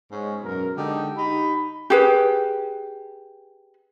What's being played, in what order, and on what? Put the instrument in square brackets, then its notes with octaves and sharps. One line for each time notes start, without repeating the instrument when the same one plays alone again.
[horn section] G#2 G#3 C#4
F#2 B2 A#4
D3 G#3 D#4 G4
D#4 G4 B5
[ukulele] G4 G#4 B4